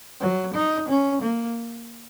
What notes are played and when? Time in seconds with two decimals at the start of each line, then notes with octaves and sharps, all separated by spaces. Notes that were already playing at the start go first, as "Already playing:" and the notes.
0.20 F#3
0.54 D#4
0.89 C#4
1.22 A#3